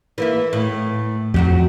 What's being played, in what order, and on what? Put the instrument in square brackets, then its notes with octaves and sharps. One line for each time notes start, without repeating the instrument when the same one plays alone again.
[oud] E3 A#3 E4
A2
[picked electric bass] F2 [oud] F#3 F#4 G4